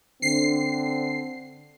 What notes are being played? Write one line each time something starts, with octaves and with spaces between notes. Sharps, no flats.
D3 C4 C7